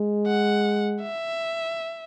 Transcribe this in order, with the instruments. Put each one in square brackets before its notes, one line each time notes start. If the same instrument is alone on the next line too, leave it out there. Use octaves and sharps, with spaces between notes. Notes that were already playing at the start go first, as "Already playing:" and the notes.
Already playing: [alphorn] G#3
[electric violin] F#5
E5